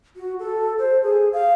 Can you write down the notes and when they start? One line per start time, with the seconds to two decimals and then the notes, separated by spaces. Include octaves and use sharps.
0.16 F#4
0.39 A4
0.78 C5
1.03 G#4
1.33 F5